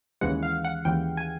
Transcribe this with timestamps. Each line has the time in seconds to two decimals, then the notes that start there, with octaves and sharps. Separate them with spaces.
0.21 D#2 C#3 E3 G#3 F#5
0.43 F5
0.65 F#5
0.85 D#2 C#3 E3 G#3 G5
1.17 G#5